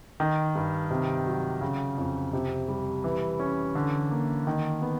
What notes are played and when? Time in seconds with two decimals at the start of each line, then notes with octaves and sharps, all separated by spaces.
0.20 D#3
0.55 G2
0.91 C3
1.26 F#3
1.61 C#3
1.98 F2
2.33 C3
2.68 G3
3.04 E3
3.40 C#4
3.75 D3
4.11 A#3
4.47 D#3
4.82 B3